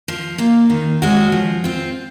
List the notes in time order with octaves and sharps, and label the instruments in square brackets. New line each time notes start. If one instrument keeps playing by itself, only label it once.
[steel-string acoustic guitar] F3
A#3 F4
D#3
G#3 C#4 F#4
F3
C4 F4